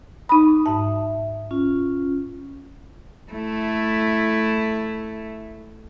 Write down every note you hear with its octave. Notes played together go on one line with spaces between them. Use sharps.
D#4 B5 D#6
G#2 E5 A5
C#4 F4
A3 E4